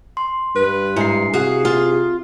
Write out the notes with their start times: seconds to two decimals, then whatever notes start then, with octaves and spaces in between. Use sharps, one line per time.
0.17 C6
0.55 G2 B4
0.96 G#2 E4 C7
1.34 C3 F#4 G#4 F5
1.65 F4